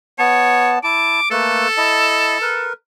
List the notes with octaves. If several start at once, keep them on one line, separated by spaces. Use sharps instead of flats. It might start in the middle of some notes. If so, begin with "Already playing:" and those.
B3 C#5 A5
E4 A5 D6
A3 A#3 A4 B4
E4 D#5 A5
A#4 B4